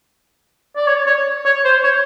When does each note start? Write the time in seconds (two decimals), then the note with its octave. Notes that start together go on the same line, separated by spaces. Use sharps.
0.76 D5
0.87 C#5
1.06 C#5
1.45 C#5
1.64 C5
1.83 C#5